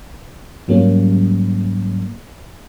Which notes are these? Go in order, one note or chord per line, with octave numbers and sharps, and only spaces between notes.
G#2 F#3 G3 A#3 C#4